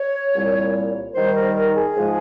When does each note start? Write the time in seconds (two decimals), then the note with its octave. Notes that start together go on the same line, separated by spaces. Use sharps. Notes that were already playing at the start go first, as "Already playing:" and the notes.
Already playing: C#5
0.34 C2 A#2 G3
1.14 D#2 D#3 G3 C5
1.34 A#4
1.54 A#4
1.75 G#4
1.95 G#2 F3 G#3